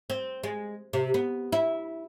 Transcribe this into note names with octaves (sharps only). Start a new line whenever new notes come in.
C4
G#3
C3
B3
E4